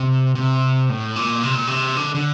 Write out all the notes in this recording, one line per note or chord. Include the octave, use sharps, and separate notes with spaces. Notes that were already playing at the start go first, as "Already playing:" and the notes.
Already playing: C3
C3
A2
A#2
C3
A#2
C3
D3
D3